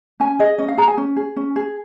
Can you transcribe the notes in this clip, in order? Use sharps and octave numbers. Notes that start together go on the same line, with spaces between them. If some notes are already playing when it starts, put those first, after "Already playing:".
C#4 G#5
G#4 D#5
C#4 D#5
F5
G#4 A#5
G#5
C#4
G#4
C#4
G#4